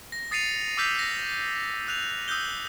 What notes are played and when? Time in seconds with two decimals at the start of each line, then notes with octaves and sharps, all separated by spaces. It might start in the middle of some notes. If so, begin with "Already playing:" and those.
0.12 A#6
0.31 D#6 A6 C7 C#7 D#7 F7
0.77 D6 E6 F6 G6 B6 F7
0.99 A#6
1.87 E6 F#6 F7
2.28 D#6 E6 F#6 G6 G7